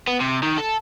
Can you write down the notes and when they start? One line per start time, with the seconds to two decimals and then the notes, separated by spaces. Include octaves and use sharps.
0.07 B3
0.20 C3
0.43 D#3
0.58 A4